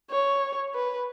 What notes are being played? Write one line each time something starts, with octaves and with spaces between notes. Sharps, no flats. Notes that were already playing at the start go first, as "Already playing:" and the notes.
C#5
B4